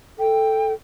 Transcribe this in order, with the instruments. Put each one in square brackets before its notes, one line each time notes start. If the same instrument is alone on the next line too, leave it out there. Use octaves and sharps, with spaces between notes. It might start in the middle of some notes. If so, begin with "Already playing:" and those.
[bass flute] A4 [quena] G5